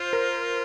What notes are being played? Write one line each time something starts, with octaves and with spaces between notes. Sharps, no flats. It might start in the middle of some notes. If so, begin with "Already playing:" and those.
Already playing: F4 C5
A#4